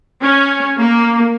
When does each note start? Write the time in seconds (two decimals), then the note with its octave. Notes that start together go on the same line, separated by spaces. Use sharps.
0.22 C#4
0.79 A#3